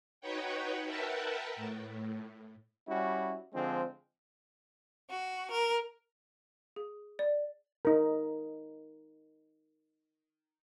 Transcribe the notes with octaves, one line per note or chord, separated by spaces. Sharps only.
D#4 F#4 B4 C#5 F#5 G5
A#4 B4 E5 F#5 G5 A5
A2
G3 C#4 E4 F#4
D3 F3 G#3 C4
F#4
A#4
G#4
D5
D#4 A#4